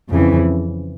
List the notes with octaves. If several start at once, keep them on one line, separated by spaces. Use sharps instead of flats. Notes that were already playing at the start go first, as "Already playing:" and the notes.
F2 C#3 E3